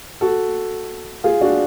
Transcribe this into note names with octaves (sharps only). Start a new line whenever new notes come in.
F#4 A4
F4 G#4
D4 F#4